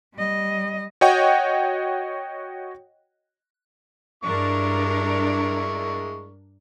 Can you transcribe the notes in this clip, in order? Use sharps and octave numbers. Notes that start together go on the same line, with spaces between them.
G3 D#5
F#4 C#5 D#5 F#5 G5 C#6
G2 G#3 D4 E4 A#4 C#6